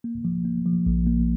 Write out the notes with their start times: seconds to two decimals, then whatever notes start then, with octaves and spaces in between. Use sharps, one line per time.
0.04 A#3
0.25 F3
0.45 A#3
0.66 F3
0.86 A#1
1.07 A#3